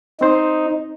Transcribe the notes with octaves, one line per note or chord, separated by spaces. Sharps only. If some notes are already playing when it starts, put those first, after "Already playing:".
C4 D#4 C5